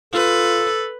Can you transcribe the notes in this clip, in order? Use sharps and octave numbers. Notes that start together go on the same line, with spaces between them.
F4 A4 B4